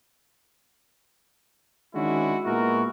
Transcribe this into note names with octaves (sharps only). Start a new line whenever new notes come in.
D#3 G#3 C#4 D4 E4 F#4
A#2 G#3 B3 E4 F#4 A#4